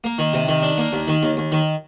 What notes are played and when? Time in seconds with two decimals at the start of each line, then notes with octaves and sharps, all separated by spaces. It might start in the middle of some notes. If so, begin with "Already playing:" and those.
0.04 A#3
0.18 D#3
0.33 C3
0.48 D#3
0.63 D4
0.78 A#3
0.93 D#2
1.08 D#3
1.23 D#2
1.37 D#2
1.52 D#3